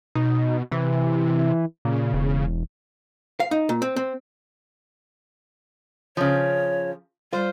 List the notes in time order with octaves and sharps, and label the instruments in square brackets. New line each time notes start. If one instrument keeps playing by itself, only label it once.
[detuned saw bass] B2 [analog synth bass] D#4
[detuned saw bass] C3 [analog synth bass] E3
[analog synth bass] A#2 [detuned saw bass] C#3
[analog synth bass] E1
[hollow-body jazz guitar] F5
D#4
A#2
C4
C4
[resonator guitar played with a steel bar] C#3 F3 [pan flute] C#5
[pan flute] G3 [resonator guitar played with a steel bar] F4 C5